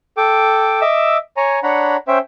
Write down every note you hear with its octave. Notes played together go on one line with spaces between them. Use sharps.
A4 G5 D6
D#5 E5 D6 E6
C#5 G#5 A#5
D4 C#5 F#5 A#5 B5
C#4 C5 E5 G5